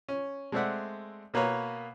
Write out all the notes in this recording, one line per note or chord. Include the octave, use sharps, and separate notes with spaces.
C#4
G#3 A3 C4 D5 E5 F#5
B2 A#3 B4 C#5 A#5